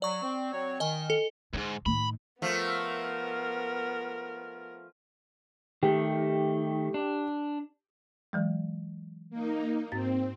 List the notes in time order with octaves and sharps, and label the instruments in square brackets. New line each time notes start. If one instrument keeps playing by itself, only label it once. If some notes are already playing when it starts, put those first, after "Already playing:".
[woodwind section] F#3 [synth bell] D5 C#6
[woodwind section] C4
F#3 C4 C#5
[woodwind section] D#3 [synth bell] D#5 G#5
[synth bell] A4
[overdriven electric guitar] D#2 G#2 [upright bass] D3
[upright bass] A2 D#3 [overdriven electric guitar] B5
[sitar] F3 A3 [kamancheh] B3 A#4
[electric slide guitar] D#3 A3 [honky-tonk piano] G4
[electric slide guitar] D4
[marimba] E3 F#3 G#3
[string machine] A#3 D#4
[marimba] G#2 A6 [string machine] C4